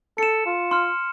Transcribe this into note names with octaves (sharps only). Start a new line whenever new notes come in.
A4 C#7 E7
F4
C6 F6